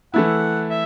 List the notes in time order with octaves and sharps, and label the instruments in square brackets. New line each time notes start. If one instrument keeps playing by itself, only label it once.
[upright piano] E3 A3 E4 [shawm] F#5
[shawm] E5